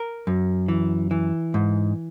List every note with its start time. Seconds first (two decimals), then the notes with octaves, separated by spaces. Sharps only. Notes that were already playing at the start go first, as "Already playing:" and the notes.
Already playing: A#4
0.27 F#2
0.68 E3
1.11 E3
1.54 G#2